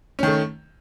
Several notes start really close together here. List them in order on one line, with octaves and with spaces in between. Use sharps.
C#4 D#3 A3